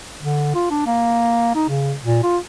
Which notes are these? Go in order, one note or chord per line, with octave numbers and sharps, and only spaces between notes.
D3
F4
D4
A#3
D#4
C#3
A#2
F4